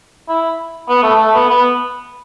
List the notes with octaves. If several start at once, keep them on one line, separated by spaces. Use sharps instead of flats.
E4
B3
A3
A3
B3
B3